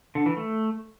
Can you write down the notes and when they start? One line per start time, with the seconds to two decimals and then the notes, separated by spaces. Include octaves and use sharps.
0.15 D3
0.26 E3
0.37 A3